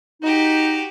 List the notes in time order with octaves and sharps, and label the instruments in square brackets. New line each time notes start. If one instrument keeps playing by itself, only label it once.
[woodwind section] D#4 [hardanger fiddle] F#4 G4